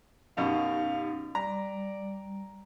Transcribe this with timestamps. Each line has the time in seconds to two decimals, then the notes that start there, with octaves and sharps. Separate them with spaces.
0.37 F#2 B2 C#4 D#4 G4 F5
1.35 G3 D5 A#5